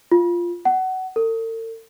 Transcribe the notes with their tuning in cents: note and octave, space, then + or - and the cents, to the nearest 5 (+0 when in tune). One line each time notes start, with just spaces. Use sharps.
F4 -5
F#5 +20
A4 +45